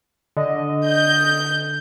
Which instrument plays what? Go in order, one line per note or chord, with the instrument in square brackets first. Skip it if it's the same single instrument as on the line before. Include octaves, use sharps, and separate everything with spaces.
[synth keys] D3 [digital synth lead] D#5
[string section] G6